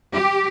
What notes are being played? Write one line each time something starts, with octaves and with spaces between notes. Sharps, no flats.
G4